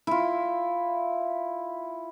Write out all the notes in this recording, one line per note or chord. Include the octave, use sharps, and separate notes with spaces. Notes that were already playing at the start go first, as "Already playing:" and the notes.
E4 F4